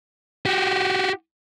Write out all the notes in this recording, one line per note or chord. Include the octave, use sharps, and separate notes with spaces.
F#4 G4